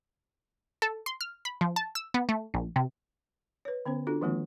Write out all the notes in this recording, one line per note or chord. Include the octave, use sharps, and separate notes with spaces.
A4
C6
F6
B5
F3
A5
E6
B3
A3
A#1
C3
B4 C#5
D3 B3 C#4 C5
D4 F4 F#4 A4
D#3 F3 G#3 A#3 C4 F4